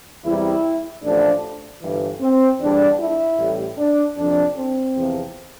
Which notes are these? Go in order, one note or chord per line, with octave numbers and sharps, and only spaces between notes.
E2 C3 G3 E4
A1 A2 F3 D4
G1 G2 E3
C4
E2 D3 G3 D4
E4
A1 A2 G3
D4
F2 C3 F3 D4
C4
E2 C3 F3